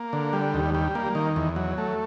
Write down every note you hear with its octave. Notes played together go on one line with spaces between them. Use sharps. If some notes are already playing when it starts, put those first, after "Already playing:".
Already playing: A#3
D3
G3
D#2
G3
A#3
D#3
E2
F#3
A3